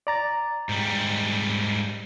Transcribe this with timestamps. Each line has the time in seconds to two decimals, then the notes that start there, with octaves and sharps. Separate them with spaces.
0.07 D5 A#5 A6
0.69 G#2 G3